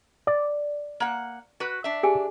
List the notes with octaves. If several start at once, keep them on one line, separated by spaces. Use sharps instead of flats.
D5
A#3 F#5
F#4 B4
D4 E5
G4 G#4 G#5